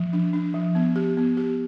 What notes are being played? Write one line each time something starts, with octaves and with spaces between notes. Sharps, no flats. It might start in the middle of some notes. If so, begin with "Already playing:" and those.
Already playing: F3
D4
D4
F3
B3
G4
B3
G4